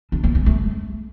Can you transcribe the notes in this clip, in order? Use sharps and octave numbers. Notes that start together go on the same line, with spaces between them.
D4
A#3
C#4
A3